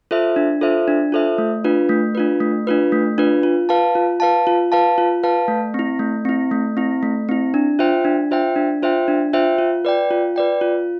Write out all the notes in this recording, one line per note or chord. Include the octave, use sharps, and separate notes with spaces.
F4 A4 C5 E5
D4
F4 A4 C5 E5
D4
F4 A4 C5 E5
A3
D4 F4 B4
A3
D4 F4 B4
A3
D4 F4 B4
A3
D4 F4 B4
F4
B4 F5 A5
F4
B4 F5 A5
F4
B4 F5 A5
F4
B4 F5 A5
A3
C4 E4
A3
C4 E4
A3
C4 E4
A3
C4 E4
D4
F4 C5 E5 G5
D4
F4 C5 E5 G5
D4
F4 C5 E5 G5
D4
F4 C5 E5 G5
F4
B4 D5 G5
F4
B4 D5 G5
F4